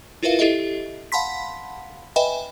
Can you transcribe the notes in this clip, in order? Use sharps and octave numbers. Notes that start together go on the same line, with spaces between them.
E4 F4 A#4 B4 E5 F5
E4 G4 A4 D#5 E5
F5 F#5 A5 B5 C6 B6
B4 D#5 E5 G5 G#5 B5